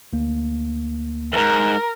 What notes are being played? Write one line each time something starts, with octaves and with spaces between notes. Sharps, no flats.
D2 A#3
E2 G#2 A#4